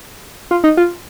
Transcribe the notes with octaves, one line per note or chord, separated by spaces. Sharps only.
F4
D#4
F4